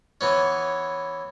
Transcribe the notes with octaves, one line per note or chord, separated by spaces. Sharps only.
E3 B3 C#4